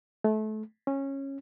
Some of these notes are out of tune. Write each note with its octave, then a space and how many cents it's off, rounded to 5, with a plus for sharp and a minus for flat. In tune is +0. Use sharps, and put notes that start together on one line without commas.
A3 -30
C#4 -15